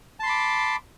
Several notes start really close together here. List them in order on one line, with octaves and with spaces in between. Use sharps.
A5 C6 B5 D6